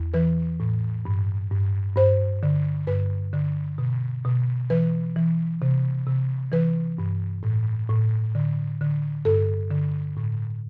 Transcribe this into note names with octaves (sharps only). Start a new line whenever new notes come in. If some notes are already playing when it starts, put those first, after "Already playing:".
Already playing: E2
E3 B4
A2
G2
G2
G2 C5
D3
G2 B4
D3
B2
B2
E3 B4
E3
C3
C3
E3 B4
G2
A2
A2
D3
D3
G2 A4
D3
A2